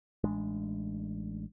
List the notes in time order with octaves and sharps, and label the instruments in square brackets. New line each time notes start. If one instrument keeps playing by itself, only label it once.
[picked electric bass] A1 G#3 D4